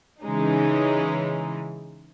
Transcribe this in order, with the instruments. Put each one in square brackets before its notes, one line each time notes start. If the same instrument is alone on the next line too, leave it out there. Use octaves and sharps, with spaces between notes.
[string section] C#3 E3 G#3 C#4 D#4